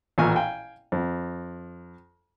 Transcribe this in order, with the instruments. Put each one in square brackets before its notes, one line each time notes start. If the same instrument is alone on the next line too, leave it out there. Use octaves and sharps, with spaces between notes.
[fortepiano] A1 A#2 E3 G#5 C#6 F6
F5 G5 G#5
F2